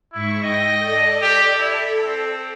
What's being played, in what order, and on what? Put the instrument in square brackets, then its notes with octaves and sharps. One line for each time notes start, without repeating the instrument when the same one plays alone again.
[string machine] G#2 C#6 [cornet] E4
[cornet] D#5 [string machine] G5 A#6
[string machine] A4 D5
[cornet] G4
[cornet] E4 [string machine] A4
[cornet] C4